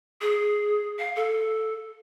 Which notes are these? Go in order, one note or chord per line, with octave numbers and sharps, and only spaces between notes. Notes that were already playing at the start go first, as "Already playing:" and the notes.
G#4
F5
A4